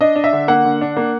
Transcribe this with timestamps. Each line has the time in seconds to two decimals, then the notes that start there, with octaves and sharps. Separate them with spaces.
0.01 D4 D#5
0.16 D4
0.24 E5
0.33 D3
0.48 A#3 F#5
0.65 D3
0.81 D4
0.97 A#3